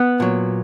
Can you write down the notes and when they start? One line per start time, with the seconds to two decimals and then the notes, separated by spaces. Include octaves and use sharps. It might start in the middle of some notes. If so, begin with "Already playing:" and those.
Already playing: B3
0.20 A#2 F#3